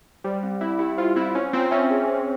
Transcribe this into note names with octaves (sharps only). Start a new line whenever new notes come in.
G3 C5
C4
C4 E4
E4 G4
F4 C5
C4 E4
C#4 C5
C4 F4
C#4 E5
G#4
C5